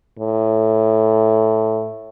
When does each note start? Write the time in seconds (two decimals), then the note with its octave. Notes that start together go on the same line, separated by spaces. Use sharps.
0.19 A2